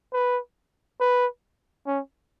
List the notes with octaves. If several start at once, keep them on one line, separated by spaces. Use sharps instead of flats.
B4
B4
C#4